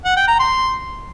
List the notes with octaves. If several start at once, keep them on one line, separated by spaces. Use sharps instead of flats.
F#5
G5
A#5
C6